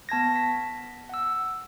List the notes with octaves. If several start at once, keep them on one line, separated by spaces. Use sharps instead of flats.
B3 A5 G#6 A#6
B6
F#5 E6